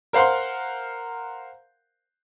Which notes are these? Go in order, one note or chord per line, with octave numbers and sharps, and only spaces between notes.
A#4 C5 F5 F#5 C6